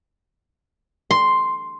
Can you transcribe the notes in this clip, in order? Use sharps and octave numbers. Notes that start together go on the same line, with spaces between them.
C6